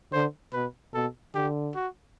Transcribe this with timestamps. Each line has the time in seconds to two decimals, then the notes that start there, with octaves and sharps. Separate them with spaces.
0.13 D3 C5
0.53 B2 B4
0.94 B2 A4
1.35 D3 G4
1.75 F#4